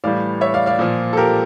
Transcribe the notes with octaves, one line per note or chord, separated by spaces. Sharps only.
A2 E3 G3 D5 F5
C#5 E5
D5 F5
D5 F5
A#2 F3
A4
G4 A#4